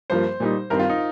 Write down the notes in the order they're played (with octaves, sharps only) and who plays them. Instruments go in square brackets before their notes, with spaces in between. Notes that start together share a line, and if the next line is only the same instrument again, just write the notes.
[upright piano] G2 F3 A#3 [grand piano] C5
[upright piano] A#2 G3 D#4
[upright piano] G2 D#3 C4 [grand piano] A#4
[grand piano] F4
D#4